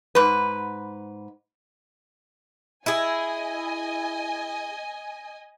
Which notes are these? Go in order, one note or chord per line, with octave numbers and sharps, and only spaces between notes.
G#2 B4
E4 G#4 D#5 G#5